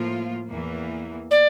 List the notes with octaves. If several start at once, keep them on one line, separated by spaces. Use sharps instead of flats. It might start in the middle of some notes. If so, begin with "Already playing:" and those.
Already playing: A2 F3 A#3 F4
E2 E3 A#3
D5